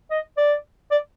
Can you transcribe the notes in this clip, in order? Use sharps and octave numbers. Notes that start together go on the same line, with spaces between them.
D#5
D5
D5